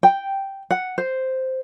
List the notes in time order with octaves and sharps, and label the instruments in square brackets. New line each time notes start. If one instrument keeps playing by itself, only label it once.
[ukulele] G5
F#5
C5